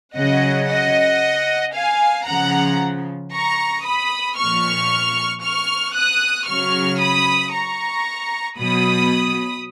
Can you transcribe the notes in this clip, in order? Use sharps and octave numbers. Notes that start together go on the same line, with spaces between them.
C#3 F#3 D#5 F#5
D#5 F#5
F5 G#5
C#3 F3 F#5 A#5
A#5 C#6
B5 D#6
A#2 F3 C#6 F6
C#6 F6
D#6 F#6
C#3 F#3 C#6 F6
B5 D#6
A#5 C#6
B2 F#3 B5 D#6